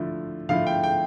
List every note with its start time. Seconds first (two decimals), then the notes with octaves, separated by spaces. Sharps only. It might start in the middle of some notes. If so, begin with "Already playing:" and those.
Already playing: D3 F3 A3 E4
0.49 D3 F3 A3 E4 F5
0.67 G5
0.84 G5